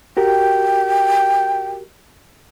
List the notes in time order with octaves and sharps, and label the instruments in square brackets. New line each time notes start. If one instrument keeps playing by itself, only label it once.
[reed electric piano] F#4 G4 A#4 [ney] G5